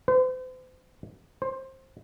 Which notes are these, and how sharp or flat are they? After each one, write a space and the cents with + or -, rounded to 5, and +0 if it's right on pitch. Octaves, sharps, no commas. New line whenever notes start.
C5 -40
C5 +20